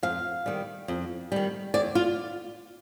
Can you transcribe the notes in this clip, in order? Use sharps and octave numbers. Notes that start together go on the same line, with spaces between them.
F2 F5
D#3 G3
F2
D#3 G3
D#2 D5
F4